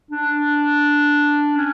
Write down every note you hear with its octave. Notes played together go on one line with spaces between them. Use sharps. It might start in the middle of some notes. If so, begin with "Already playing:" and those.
D4
C#4